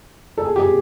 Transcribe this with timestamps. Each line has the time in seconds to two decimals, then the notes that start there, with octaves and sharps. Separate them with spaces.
0.38 A4
0.44 G#4
0.56 G4
0.59 G#4